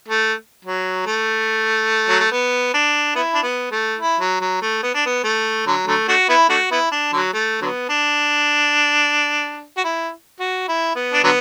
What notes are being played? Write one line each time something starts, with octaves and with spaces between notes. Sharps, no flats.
A3
F#3
A3
F#3
A3
B3
D4
B3 E4
D4
B3
A3
E4
F#3
F#3
A3
B3
D4
B3
A3
D3 F#3
D3 F#3 A3
A3 D4 F#4
B3 E4
A3 D4 F#4
B3 E4
D4
D3 F#3
A3
D3 F#3 B3
D4
F#4
E4
F#4
E4
B3
D4
D3 F#3 B3